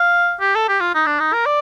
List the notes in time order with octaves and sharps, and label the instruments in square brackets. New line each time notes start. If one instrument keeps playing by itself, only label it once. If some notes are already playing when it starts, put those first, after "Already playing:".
Already playing: [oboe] F5
G4
A4
G4
F4
D#4
D4
D#4
A#4
D5